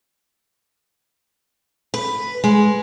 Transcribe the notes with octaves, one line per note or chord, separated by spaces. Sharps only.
B4
G#3